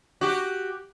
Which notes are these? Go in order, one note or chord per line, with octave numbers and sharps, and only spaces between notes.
F#4 G4